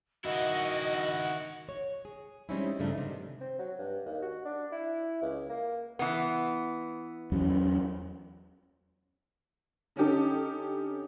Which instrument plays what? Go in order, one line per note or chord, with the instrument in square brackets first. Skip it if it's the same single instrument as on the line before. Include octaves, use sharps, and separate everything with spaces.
[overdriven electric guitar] D#3 E4 [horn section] F#4 [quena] D#5 [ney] F#5
[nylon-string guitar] C#5
G#4
G3 G#3 C4 C#4 D#4 E4
G2 C#3 F3 A3 D4 D#4
G#2 C3 D#3
[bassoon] C4
F#3
G2
D#2
F#4
D4
E4
C#2
A#3
[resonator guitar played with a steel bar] E3 B3
[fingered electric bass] E2 F#3 C#4
[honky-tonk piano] D3 C#4 D#4 G4 A4